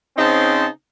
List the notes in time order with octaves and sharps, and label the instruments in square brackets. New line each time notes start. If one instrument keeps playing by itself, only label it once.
[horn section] C#3 C4 C#4 D#4 C5 A5